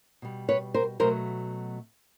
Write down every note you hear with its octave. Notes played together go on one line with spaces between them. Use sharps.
B2 G3
B4 C#5
A#4 C5
B2 F#3 A3 A#4 C5